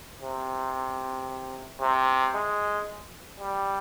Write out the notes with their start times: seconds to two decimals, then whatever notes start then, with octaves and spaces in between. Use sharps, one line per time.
0.21 C3
1.81 C3
2.35 G#3
3.40 G3